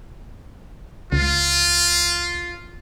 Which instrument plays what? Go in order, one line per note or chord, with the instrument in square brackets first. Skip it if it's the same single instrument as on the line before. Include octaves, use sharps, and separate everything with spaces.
[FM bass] C#2 [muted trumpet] F4